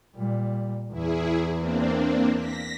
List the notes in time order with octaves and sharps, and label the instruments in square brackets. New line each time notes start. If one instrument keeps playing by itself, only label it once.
[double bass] A#2 G3
[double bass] E2 [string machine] E4 G#4
[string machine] A#3 C4 D4
A#6 B6